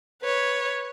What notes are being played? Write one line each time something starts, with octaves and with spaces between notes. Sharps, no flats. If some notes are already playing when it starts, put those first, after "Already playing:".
B4 C#5